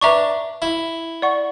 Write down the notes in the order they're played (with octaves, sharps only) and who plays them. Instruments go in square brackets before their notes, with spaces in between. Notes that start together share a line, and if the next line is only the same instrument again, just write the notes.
[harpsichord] D4 [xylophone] B4 E5 A#5 C#6
[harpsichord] E4
[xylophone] D5 F#5 C#6